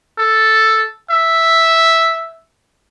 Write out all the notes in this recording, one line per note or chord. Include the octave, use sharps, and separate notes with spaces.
A4
E5